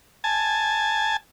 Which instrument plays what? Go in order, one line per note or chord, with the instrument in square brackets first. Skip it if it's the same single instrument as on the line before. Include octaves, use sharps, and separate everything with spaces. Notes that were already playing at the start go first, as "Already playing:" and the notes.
[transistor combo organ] G#5 A5